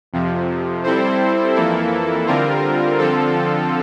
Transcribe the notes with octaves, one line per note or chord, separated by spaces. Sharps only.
F2 C3 F3
G3 C4 E4 A4 C5
F2 E3 A#3 E4 A4
D3 G3 C4 F4 A#4
D3 F3 C4 F4 A4